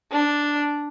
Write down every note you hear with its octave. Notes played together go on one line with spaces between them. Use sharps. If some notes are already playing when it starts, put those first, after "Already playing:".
D4